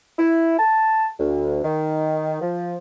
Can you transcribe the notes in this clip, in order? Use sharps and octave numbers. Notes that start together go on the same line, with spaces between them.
E4
A5
D2
D#3
F3